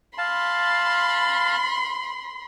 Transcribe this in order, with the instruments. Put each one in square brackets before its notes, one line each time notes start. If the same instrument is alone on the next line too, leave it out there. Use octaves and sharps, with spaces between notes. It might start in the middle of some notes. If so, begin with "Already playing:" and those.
[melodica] F5 A5 [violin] B5 C6